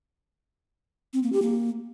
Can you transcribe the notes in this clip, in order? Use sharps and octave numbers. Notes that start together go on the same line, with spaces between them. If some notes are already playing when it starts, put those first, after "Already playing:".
C4
A#3
G4
A#3